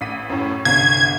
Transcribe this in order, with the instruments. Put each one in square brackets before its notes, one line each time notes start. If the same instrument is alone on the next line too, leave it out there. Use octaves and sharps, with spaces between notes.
[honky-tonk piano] A1 B6 D#7
F#2 A2
[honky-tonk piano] G1 C2 [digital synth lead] G#6